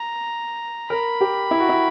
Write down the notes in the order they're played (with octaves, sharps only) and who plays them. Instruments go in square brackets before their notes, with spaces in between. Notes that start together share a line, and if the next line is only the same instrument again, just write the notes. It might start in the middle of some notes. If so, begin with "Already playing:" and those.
Already playing: [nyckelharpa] A#5
[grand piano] A#4 [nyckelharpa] B5
[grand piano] G4
E4
F#4
E4